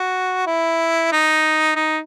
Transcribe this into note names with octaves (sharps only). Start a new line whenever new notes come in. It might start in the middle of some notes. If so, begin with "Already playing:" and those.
Already playing: F#4
E4
D#4
D#4